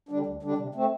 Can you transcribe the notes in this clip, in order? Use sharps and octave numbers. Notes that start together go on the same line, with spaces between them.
D3 G3 D4
D2
D3 G3 D4
C3
A3 C4